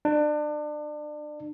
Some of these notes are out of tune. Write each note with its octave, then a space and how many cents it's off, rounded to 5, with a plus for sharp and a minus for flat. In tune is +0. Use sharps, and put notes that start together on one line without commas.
D4 +30